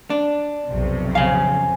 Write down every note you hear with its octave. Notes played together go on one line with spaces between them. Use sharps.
D4
B1 F2 C3
C#3 F5 G#5